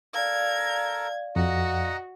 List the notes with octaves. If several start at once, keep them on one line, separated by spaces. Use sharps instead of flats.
A4 A#4 D5 F5 A#5 G#6
F2 F#4 D#5 F#5 A#5